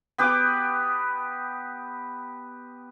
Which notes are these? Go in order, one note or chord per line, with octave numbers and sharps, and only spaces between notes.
B3 G4 B4 D6